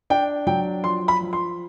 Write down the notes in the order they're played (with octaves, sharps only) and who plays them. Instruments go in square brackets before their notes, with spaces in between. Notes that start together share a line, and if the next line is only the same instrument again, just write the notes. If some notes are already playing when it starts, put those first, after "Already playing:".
[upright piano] D4 G5
F#3 G5
F3 C6
B5
F3
C6